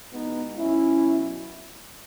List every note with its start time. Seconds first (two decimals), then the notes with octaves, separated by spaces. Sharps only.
0.12 E2 B2 G#3 B3 D#4
0.57 G#2 F#3 C#4 E4
1.01 B2 F#3